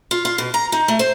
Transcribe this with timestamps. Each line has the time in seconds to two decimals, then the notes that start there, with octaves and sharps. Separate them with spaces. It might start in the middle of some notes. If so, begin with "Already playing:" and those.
0.11 F4
0.25 F4
0.38 B2
0.54 A#5
0.72 D#4
0.88 A3
0.99 C5